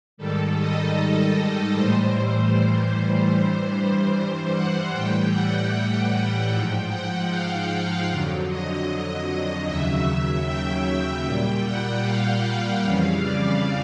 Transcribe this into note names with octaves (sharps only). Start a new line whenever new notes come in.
G#2 D#3 G3 A4
D#5
A2 E3 G3 C5
C5
G2 E3 G3
C5
F#5
A2 E3 G3 G5
F#5
G#2 F3 G5
F#5
F5
F2 D3 F#3
D#5
D#2 C#3 F#3 E5
G5
A#2 G3 G5
F#5
F5
F#5
F2 C#3 E3 G3 F5
D5